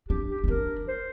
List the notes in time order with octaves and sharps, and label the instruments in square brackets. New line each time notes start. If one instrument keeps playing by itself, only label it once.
[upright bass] D4 [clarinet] G4
[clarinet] G4
[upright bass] C4
[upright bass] D4 [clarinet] A#4
[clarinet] C5